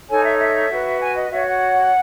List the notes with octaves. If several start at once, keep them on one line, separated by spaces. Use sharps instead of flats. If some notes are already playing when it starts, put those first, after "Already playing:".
D#4 A4 C#5 G#5
E5
E5
F#4 B4
G#5
D#5
F#4 C#5 E5
F#5